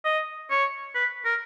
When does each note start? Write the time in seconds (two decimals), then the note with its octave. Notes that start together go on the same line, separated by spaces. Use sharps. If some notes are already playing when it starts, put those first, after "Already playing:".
0.05 D#5
0.50 C#5
0.95 B4
1.25 A#4